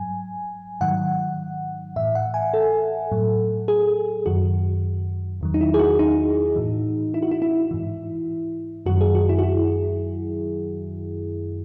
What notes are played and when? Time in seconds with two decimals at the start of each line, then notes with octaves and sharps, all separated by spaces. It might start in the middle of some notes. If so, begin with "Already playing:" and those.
Already playing: G#2 F#3 G#5
0.81 G#2 D#3 F#3 F#5
1.96 A2 E3 E5
2.15 F#5
2.34 G#5
2.54 A4
3.12 A2 F#3
3.68 G#4
4.26 F#2 D#3 F#3 F#4
5.41 E2 D#3 F#3
5.54 D#4
5.61 E4
5.74 G#4
5.79 F#4
5.99 D#4
6.56 A2 E3
7.14 E4
7.22 F#4
7.31 E4
7.42 E4
7.71 G#2 E3
8.86 F#2 D#3 F#3 F#4
9.01 G#4
9.15 F#4
9.29 E4
9.39 F#4
9.43 E4